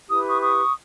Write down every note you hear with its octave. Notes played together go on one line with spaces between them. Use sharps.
E4 G4 B4 D#6
C#6 D#6
C#6 D#6